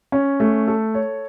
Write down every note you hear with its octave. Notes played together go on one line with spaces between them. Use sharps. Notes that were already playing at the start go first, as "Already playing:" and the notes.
C#4
A3
A4
C#5